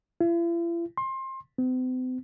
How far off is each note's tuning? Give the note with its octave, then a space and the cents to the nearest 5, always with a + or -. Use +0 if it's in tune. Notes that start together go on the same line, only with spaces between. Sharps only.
E4 +45
C6 +25
C4 -45